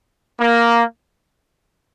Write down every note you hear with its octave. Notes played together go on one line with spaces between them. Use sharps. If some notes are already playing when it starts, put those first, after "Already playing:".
A#3